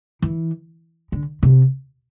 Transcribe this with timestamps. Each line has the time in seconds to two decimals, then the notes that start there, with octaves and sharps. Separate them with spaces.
0.22 E3
1.12 D3
1.43 C3